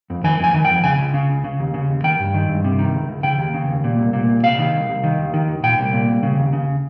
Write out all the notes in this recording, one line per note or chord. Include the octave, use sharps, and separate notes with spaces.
F2
D#3 G#5
F2 G#5
D#3
F2 G5
C#3 G#5
C#2
C#3
C#2
C#3
D#2
C#3
D#2
D#3 G5
G2
D#3
G2
C3
D#3
C#2
C#2
C#3 G5
D#2
C#3
D#2
A#2
C2
A#2
C2
C3 F5
D#3
C2
C2
D#3
D#2
D#3
D#2
A#2 G5
C2
A#2
C2
C#3
D#2
C#3